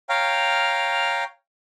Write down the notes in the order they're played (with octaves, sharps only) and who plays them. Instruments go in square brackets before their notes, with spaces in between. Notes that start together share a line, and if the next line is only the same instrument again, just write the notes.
[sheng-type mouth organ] C#5 F5 G5 A#5 F6